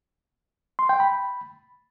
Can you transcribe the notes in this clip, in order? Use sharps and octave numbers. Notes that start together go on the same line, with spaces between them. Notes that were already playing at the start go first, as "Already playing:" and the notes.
C6
G5
B5